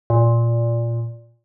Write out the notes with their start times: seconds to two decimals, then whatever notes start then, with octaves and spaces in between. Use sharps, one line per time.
0.10 A#2